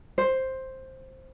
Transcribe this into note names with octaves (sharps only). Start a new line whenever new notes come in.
C5